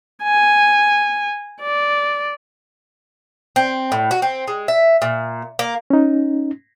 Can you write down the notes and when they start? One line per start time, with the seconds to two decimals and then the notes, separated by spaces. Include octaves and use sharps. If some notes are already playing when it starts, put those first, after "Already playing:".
0.23 G#5
1.62 D5
3.56 C4
3.92 A2
4.11 F#4
4.22 C4
4.48 G#3
4.68 E5
5.02 A#2
5.59 A#3
5.90 C#4 D#4